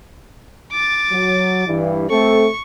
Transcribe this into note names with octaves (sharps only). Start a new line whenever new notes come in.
D6 A6
F#3
G2 E3
A3 C4 A4 C#6